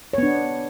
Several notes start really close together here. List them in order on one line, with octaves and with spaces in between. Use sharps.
C#5 B3 D4